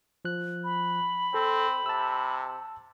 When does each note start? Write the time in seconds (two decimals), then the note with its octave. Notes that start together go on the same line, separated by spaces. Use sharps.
0.25 F3 F#6
0.64 B5
1.34 C4 A4
1.86 C3 A5 E6